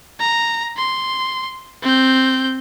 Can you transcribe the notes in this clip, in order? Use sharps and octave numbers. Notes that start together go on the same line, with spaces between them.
A#5
C6
C4 G6